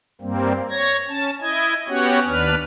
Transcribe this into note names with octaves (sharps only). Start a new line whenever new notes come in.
G2 G3 A#3 C4
C#5 G#6 A#6
C#4 A5
E4 D#5 G#6
B3 C#4 F#4 G4 C#5 F#5
D#2 D4 B4 F6